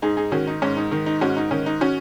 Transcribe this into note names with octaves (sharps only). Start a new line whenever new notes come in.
G#2 D#4 G#4
D#4 G#4
D#3 C#4 F#4
D#4
G#2 C#4
D#4
D#3 D#4
D#4
G#2 C#4 F#4
D#4
D#3 C#4
D#4
C#4 F#4